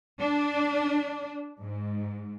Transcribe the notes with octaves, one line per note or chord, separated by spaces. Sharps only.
D4
G#2